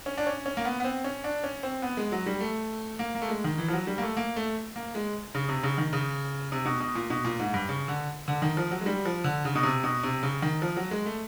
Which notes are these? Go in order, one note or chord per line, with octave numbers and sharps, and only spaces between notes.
C#4
D4
C#4
C#4
A#3
B3
B3
C4
C#4
D4
C#4
C4
B3
G#3
F#3
G3
A3
A#3
A#3
A3
G#3
D#3
E3
F3
F#3
G3
A#3
A3
A#3
A3
A#3
G#3
C#3
C3
C#3
D#3
C#3
C3
B2
B2
A#2
B2
A#2
G#2
G2
C#3
D3
D3
D#3
F3
F#3
G#3
G3
F3
D3
C#3
B2
C3
B2
C3
C#3
D#3
F3
F#3
G#3
A3